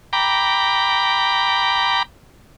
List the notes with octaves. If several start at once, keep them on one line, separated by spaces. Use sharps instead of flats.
G5 A#5 B5 D6